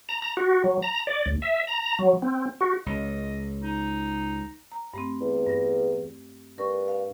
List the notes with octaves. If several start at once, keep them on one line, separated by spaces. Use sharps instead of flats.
A#5
A#5
F#4
F#3
A#5
D5
D2
E5
A#5
F#3
C4
F#4
C#2 D#5
D#4
A#5
G2 A3 C4
E2
G2 A#6
G2 A#4 C#6
F5